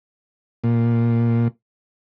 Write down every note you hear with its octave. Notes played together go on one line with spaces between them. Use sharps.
A#2